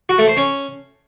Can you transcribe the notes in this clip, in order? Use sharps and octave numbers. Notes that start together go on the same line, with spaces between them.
F#4
A3
C5
C#4